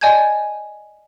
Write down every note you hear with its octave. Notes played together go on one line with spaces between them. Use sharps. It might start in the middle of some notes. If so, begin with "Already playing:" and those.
D5 D#5 G#5 A5 G6 G#6